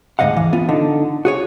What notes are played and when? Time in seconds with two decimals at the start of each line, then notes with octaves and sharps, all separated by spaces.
0.19 D2 G#2 G3 D#5 F5 F#5
0.37 E3
0.53 B3 F4
0.69 D3 D#4
1.25 F#4 G#4 C#5